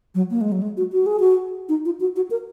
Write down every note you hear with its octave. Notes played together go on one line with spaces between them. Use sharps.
F#3
A#3
G#3
F#3
G#3
F#4
F#4
G#4
F#4
D#4
F4
F#4
F#4
A#4